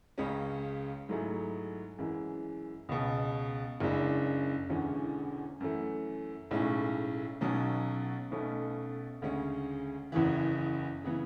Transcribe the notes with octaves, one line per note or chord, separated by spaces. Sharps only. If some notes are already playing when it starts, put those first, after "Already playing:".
C#2 C#3 G#3 C#4
G#2 F#3 A3 E4 G#4
F#2 E3 G#3
C#2 B2 G#3
F#1 F#2 C#3 G#3 D4
E1 E2 D3 G#3 C#4
F#2 E3 A3
B1 A2 G#3 C#4
B1 B2 F#3 C#4
B1 B2 A3 C#4
D2 C#3 G#3 C#4
F#1 E2 C#3 E3
C#3 E3 B3